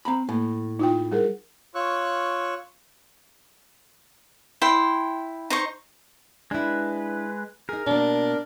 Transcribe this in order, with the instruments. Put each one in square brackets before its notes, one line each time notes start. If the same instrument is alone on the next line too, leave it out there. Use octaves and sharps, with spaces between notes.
[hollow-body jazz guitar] C4 A#5 B5
[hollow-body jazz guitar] A2 [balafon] A#3
[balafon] D#4 F4 G5
G3 G#4 A#4
[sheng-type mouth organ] F4 C#5 C#6 E6 F#6
[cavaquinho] E4 G5 C6
D#4 C5 C#6
[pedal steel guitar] G#3 B4 [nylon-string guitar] D4 E4
[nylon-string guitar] D#4 G#4 [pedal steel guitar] A#4
[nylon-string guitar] B2 A#3 [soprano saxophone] D4